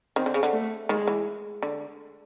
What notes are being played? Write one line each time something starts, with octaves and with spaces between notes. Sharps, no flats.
D#3 C4
D3
C#3
D3
A3
D#3 G#3
E3
D3